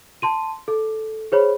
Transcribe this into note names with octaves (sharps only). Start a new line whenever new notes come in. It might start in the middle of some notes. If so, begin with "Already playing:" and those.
A5 C6 D#7
A4
G#4 C5 C#5 B5